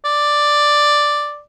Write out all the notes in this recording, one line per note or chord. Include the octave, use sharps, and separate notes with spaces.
D5